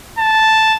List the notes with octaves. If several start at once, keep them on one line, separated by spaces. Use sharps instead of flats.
A5